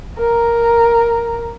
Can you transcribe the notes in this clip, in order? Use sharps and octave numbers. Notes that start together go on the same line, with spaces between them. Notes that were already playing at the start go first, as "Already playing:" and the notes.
A#4 A#5